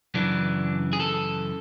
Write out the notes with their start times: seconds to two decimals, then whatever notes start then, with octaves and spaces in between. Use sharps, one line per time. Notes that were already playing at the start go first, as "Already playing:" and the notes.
0.14 F#2 C#3 E3 D4
0.93 G#4
1.00 A4